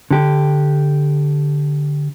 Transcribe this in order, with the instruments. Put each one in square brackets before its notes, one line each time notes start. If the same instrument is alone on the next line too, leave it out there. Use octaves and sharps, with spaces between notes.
[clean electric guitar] D3 G4